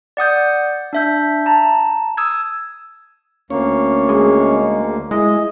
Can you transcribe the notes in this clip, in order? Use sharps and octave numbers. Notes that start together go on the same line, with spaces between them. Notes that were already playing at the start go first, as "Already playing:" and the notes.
D5 F#5 D#6 G6
D4 E5 G6
A5 A#5
D#6 E6 G#6
D2 A#3 C#4 C#5
G#3
G#3 E4 D#5